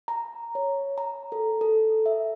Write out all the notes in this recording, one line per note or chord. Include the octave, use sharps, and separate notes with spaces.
A#5
C#5
A#5
A4
A4
E5